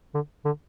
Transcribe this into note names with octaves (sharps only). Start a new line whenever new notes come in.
D3
D3